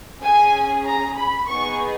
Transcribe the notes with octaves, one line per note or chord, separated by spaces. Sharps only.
C#4 G#4 G#5
A#5
B5
B3 D#4 G#4 C#6